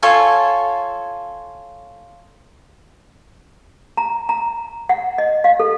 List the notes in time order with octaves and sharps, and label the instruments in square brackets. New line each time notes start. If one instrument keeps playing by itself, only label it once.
[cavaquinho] F4 A4 C#5 G#5
[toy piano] A#5
A#5
F#5
D#5
F5
A4